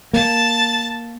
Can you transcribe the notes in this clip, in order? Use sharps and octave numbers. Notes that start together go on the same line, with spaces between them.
A#3 A5